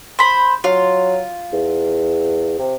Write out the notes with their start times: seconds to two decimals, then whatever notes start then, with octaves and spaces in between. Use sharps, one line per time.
0.19 C5 B5
0.64 F#3 F4
1.53 E2
2.59 C3